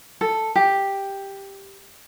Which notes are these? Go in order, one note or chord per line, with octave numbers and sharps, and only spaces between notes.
A4
G4